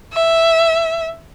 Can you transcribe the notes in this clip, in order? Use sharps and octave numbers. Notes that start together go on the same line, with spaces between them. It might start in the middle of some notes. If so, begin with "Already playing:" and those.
E5